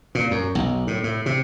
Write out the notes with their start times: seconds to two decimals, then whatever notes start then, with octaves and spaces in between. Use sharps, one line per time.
0.15 A#2
0.31 F#2
0.55 B1
0.87 A2
1.04 A2
1.26 C3